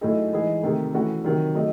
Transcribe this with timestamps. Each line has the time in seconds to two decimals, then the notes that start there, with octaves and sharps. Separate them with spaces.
0.01 A2 F#3 A3 D#4 G#4
0.33 E3 G#3 D#4 G#4
0.63 C3 D#3 A3
0.94 E3 A3 C#4 F#4
1.25 C3 D#3 F#3
1.55 F#3 A3 D#4